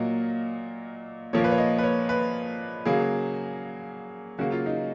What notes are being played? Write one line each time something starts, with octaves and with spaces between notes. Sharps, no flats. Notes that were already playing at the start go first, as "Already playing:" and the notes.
Already playing: A#2 F#3 A#3 D#5
A#2 F3 A#3 C#5
B4
C#5
D#5
B4
C#5
B4
C#3 F#3 A#3 G#4
C#3 F#3 A#3 F#4
F4
D#4